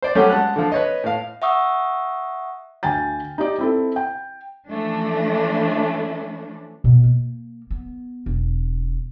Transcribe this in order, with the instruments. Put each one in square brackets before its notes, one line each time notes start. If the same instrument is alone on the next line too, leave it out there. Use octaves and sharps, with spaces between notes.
[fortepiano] C5 D5
F#3 G3 A3 C#4 G4 F#5
G#3 F#5 A5 F#6
D3 F3
B4 C#5 D#5
A2 F5
[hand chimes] E5 F#5 C#6 D#6 E6
[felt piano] D2 G5 G#5 A6
D#4 G4 D5
C4 E4 A4
G5
[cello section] E3 F3 A3 C#4 D4
[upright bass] B2
A#3
B3
E1